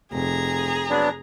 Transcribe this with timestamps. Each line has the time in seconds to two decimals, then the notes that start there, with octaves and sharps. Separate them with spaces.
0.12 F1 G#4 A#5
0.90 F#3 B3 D4